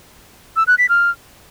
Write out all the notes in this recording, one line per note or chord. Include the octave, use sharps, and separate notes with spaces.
E6
F#6
B6
F6